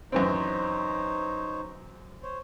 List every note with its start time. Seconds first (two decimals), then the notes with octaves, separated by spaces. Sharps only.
0.12 F#2 E3 C4 D#4 C5 C#5
2.23 C5 C#5